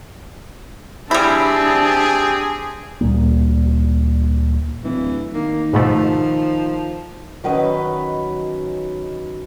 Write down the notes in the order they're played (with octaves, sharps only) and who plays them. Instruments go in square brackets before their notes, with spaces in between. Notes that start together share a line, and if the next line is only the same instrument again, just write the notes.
[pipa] G3 E4 [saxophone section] C4 G4 [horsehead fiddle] D4 A5 [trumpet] G#4
[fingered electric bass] D2 A#2 G3 A#3
[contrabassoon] D1 [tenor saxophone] E3
[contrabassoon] D#3 [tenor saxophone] A#3
[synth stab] G#2 B2 A3 [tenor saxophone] F3
[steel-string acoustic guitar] D#3 F#3 C#4 B4 D#5